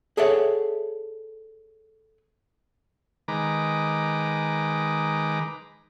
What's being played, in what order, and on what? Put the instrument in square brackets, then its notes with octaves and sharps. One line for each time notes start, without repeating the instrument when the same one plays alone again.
[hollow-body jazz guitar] G#4 A4 C#5 D5 E5 F#5
[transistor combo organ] D#3 G#3 B4 A#5 D6